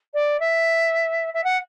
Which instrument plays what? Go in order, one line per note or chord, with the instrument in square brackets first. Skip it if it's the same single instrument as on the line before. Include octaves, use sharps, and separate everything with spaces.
[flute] D5
E5
E5
F#5